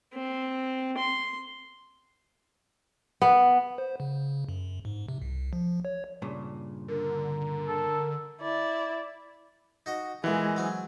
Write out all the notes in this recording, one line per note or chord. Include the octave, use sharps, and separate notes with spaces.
C4
C6
B3
C5
C#3
F#2
G#2
C3
C2
F3
C#5
G2 A#2 C#3
D3 A#4
A4
E4 D5
D#4 F#4 D#5
E2 A#2 E3 G#3
F#3 C4